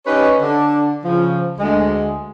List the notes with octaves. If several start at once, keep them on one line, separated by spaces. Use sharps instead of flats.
C#4 D#4 G4 B4 C#5
D3 D4
C#3 F3
D2 G#3